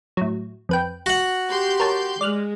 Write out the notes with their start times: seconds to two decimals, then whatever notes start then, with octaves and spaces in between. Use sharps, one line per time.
0.17 A2 F#3
0.69 F2 B4 G5
1.06 F#4 F#5
1.50 G4 C6 G6
1.80 A#4 C#5 A5
2.21 G#3 D5 F6 F#6